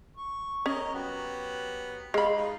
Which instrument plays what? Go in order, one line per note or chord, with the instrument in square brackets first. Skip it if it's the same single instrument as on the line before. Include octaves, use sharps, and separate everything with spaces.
[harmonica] C#6
[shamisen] C#4 [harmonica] A#4 C#5 D#5
[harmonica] F#3 B3 G4
[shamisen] G#3 B5 [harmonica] F5 C6
[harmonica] D#4 F4